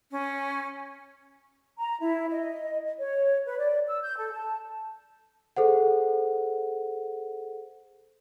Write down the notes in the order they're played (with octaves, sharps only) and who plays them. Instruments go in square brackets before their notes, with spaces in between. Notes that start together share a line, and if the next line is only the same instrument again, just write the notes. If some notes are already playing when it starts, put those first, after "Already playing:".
[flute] C#4
[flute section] A#5
E4
D#5
C#5
B4
D5
E6
G6
A4
A5
[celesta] G#4 A4 C5 F#5